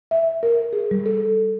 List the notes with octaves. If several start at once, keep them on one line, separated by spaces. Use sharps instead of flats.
E5
A#4
G#4
G3
A4